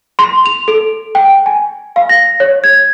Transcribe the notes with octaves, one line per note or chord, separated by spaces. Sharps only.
C6
F7
A4
G5
G#5
F5
A#6
C#5
G#6